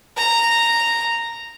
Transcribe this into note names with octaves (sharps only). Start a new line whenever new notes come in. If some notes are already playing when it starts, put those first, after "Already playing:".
A#5